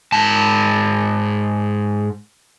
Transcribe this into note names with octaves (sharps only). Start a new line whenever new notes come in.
G#2 A5